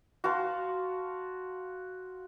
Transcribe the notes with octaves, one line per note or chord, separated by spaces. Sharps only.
F#4 F5 A5 C6